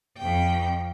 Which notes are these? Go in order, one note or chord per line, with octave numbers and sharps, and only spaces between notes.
F2 G5